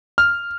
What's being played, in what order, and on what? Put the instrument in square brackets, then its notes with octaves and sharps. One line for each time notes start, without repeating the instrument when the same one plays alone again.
[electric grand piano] F6